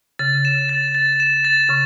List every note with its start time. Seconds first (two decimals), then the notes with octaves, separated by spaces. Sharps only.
0.19 C#3 A6
0.45 E7
0.69 A6
0.95 A6
1.20 E7
1.45 A6
1.69 C#3 C#6